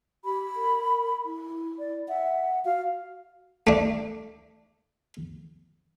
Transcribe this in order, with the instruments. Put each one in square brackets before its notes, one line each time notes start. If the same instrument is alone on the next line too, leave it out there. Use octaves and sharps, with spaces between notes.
[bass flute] G4 [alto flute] B5
[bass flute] A#4
E4
[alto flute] D5
[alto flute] E5 [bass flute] F#5
[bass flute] F#4 [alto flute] F5
[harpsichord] A3 D4